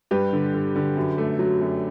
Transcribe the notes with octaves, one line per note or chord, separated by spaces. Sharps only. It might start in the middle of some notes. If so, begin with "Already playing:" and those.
G2 G4 B4
D3
D3
D3
F#2
A3
F#3
F#2